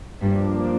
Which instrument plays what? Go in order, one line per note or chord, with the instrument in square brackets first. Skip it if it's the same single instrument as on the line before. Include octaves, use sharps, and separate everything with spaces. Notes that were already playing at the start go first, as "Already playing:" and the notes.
[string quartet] G2 [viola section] F3 A#3 D4